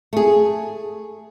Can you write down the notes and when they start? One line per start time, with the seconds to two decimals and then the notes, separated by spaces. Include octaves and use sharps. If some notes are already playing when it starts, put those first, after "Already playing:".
0.13 A3 G#4